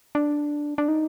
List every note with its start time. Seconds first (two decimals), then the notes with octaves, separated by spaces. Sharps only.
0.15 D4
0.78 D4
0.88 D#4